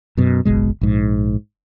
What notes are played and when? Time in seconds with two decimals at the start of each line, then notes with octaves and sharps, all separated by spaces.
0.17 F#2 B2
0.45 F#1 B1 B2 G#3
0.81 A#1 G#2